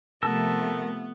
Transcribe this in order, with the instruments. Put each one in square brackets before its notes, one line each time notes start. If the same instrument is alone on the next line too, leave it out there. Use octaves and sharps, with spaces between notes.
[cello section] C3 F3 A3 [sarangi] B3 [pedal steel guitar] A#4 A5 E6